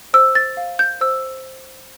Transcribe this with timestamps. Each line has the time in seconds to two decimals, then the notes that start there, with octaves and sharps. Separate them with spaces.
0.14 C5 E6
0.35 A6
0.57 F5
0.79 G6
1.01 C5 E6